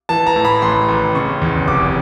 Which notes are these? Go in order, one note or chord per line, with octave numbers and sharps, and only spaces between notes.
E3 A5
A#5
A2
B5
A1 C6
A1
C#3 C#6
E2
F1 D6